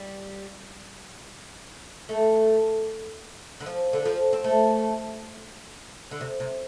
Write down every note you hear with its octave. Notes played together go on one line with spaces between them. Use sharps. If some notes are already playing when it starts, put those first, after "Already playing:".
Already playing: G3
A3
D3
F3
D3
F3
C4
A3
D3
C3
C3